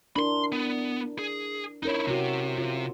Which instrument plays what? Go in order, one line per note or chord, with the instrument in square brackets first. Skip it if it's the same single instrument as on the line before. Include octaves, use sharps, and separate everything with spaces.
[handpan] D4 E4 A#4 [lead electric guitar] B5 C6
[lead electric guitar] B3
G#4
[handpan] C#4 A#4 C#5 [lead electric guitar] D#4 E4
[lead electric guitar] C3 [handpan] E4 F#4
[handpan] F4